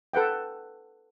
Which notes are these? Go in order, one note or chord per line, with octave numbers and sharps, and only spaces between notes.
A4 B4 F#5 G5